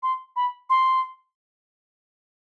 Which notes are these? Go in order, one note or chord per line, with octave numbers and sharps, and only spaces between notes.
C6
B5
C6